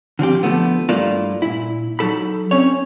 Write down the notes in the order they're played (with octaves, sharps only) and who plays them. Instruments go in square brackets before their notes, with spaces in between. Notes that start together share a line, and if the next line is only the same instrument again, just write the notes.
[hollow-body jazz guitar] D3 F3 C4 G4
D3 D#3 F3 A3 B3
G2 A3 A#3 D4 E4 F4
A#2 E4
F#3 D#4 A4 B5
C4 C#4 C#5